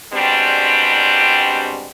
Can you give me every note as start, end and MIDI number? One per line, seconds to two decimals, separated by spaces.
0.13 1.90 47
0.13 1.90 55
0.13 1.90 56
0.13 1.90 60
0.13 1.90 62
0.13 1.90 67